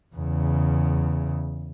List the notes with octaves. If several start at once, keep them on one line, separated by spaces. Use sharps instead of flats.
E2 C#3